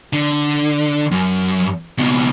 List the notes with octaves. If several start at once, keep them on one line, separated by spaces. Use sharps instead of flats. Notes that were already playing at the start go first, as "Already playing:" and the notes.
D3
F#2
C#2 B2